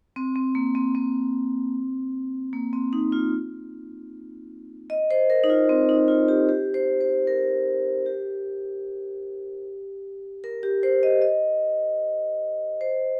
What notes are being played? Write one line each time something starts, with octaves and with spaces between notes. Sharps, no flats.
C4
C4
A#3
C4
C4
A#3
C4
D#4
F4
D#5
C5
A#4
D#4
F4
C4
D#4
F4
G4
G4
C5
C5
A#4
G4
A#4
G4
C5
D#5
D#5
C5